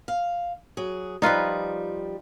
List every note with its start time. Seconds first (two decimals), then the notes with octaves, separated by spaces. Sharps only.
0.08 F5
0.77 F#3 G#4
1.22 F3 G3 D#4 F4 B4